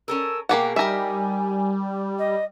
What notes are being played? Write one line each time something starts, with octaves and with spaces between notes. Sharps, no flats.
C#4 A4 A#4 E6
B2 A#3 G4 G#4 A#4 F#5 G5
G3 D#4 G4 A#4 E5 G#5
D#5